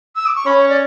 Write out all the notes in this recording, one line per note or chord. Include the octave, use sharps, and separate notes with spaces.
E6
D6
C#6
C#4 B5
C#5
D5